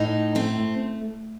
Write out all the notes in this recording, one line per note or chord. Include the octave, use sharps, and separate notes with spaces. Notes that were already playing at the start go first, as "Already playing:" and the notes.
Already playing: A2 D#4
A3 C4